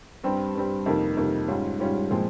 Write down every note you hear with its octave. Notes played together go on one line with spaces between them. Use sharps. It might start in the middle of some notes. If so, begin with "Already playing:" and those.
G2 G3 C4
G2 G3 C4
F2 C3 D#3 A#3 D#4
F2 C3 D#3 A#3 D#4
G#2 G3 C#4 F4
G#2 G3 C#4 F4
A#2 F3 G#3 C4